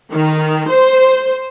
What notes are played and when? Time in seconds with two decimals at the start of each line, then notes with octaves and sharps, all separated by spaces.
0.12 D#3
0.70 C5